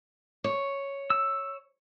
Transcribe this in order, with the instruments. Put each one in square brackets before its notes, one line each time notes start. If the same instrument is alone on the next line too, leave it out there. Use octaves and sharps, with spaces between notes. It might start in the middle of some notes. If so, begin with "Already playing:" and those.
[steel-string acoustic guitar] C#5
[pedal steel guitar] E6